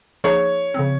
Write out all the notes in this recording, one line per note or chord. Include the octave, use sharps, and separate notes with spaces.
F3 A#3 D#4 G#4 C#5
C#3 F3 C4